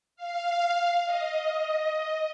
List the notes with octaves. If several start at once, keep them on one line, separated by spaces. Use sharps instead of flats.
F5
D#5